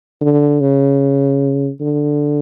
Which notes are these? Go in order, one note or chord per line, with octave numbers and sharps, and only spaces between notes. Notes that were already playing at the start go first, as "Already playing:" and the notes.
D3
C#3
D3